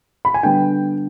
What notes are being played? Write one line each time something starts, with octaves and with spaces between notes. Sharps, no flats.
B5
G#5
D3 G3 B3 D4 G5